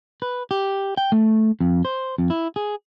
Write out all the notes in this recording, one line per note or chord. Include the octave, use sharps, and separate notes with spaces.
B4
G4
G5
A3
F2
C5
F2
E4
G#4